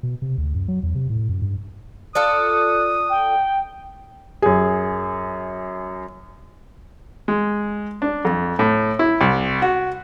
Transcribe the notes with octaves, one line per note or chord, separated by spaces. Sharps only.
B2
C3
D2
F#2
F#3
E2
C3
A2
F#2
G2
F4 A4 D5 D#6 F#6
G5
F#2 G#4
G#3
D4
F2
A2
E4
C2
F#4